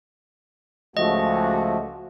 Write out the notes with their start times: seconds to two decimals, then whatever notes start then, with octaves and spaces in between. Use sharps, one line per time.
0.97 C#2 F3 A3 F#4 D#5